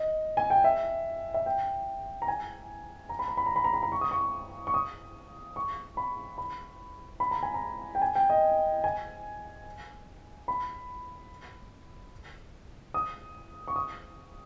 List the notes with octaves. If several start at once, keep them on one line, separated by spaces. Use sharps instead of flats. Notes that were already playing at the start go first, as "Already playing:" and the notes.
Already playing: D#5
G#5
G5
E5
E5
G5
A#5
G#5
A#5
B5
A#5
B5
A#5
B5
A#5
B5
A#5
C#6
D#6
C#6
C#6
D#6
C#6
B5
B5
B5
A#5
G#5
A#5
G5
G#5
G5
D#5
G#5
B5
D#6
C#6
D#6